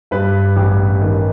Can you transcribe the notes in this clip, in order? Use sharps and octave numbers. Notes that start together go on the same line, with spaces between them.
G2 B4
A1
D#3